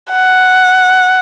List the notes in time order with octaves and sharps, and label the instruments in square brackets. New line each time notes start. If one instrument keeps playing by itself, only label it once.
[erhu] F#5